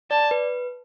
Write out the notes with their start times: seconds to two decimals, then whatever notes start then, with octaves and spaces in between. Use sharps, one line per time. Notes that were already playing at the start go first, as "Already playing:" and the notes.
0.11 D5 A5
0.31 B4